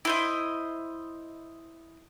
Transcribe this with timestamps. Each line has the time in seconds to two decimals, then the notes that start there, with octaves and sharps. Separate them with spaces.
0.05 E4 C5 D#5